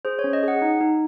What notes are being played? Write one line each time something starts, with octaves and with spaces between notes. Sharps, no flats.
G#4 C5
C#5
C#4
D#5
G#4 F#5
D#4
D#4